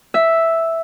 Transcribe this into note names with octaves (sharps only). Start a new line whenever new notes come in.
E5